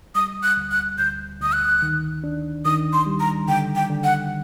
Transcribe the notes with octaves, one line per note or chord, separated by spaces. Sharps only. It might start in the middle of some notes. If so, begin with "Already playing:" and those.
G3 D#6
F#6
D2
F#6
D2 G6
D2 D#6
F#6
D#3
D4
D#3 D#6
C6
G3
A#5
D3 G5
G5
D3
F#5